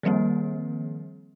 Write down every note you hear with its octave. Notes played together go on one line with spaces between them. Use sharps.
D#3 F3 G3 A#3 C4